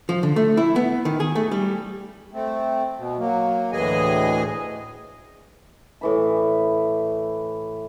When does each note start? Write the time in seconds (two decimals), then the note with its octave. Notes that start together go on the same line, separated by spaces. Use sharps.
0.09 F3
0.23 D3
0.36 A3
0.57 E4
0.76 B3
1.05 D#3
1.20 G#4
1.35 A3
1.51 G3
2.33 A3 C4
2.98 B2
3.19 F#3 A#3
3.73 D2 A2 E3 G#4 D#5 G#5
6.01 A2 E3 B5